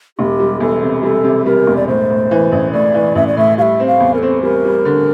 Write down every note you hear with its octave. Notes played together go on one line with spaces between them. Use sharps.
E1 G4
G3
E2 A4
C3
G3 A4
C3
G3 A#4
E1
D5
A2 C5
A2
E3
A1
A2 D5
E3
A1 E5
D5
A2 E5
G3 E5 F5
C4
F5
E2
A#4
C4 A4
G3 A#4
G3
D3